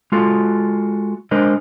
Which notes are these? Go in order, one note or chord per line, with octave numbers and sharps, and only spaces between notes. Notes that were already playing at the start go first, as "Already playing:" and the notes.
G#3 F4 F#4 A4
G#3 D4 A#4 C5 D#5